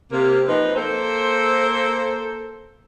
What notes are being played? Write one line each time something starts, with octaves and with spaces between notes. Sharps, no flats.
C3 A#3
F3 C4 D#4 B4
A#3 A4 C5